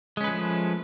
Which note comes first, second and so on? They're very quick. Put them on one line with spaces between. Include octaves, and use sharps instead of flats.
G#3 C#4 B4 F3 A3